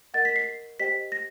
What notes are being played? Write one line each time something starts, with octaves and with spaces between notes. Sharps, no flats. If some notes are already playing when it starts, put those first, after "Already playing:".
A#4 D#5 F#5 A6
B6
C7
G4 C5 D#5 G5 B6
A#6